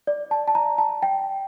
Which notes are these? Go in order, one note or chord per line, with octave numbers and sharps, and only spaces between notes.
D5
A5
A5
A#5
A5
G5